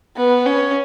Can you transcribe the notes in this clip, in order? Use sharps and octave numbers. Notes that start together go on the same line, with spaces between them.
B3
C#4